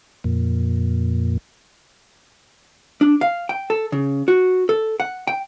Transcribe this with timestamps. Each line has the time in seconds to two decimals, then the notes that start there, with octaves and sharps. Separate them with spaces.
0.24 F2 A#2
3.01 D4
3.21 F5
3.49 G5
3.70 A4
3.92 C#3
4.28 F#4
4.69 A4
5.00 F#5
5.27 G5